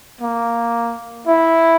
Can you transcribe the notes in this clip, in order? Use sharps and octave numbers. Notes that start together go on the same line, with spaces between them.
A#3
E4